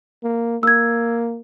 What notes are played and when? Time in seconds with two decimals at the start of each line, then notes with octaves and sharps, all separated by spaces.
0.23 A#3
0.63 A#3 E6 G#6